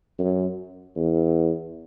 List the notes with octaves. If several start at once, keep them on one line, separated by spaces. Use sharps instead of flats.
F#2
E2